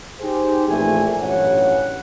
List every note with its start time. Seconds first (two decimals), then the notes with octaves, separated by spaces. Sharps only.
0.21 D#4 G4 G#4 C5
0.68 A#1 A#2 E3 A3 C4 G#5
1.20 A1 G2 F#3 C#4 C#5 F#5